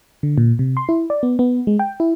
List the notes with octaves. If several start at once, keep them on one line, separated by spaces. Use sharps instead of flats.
D3
A#2
C3
C6
E4
D5
B3
B3
G#3
G5
E4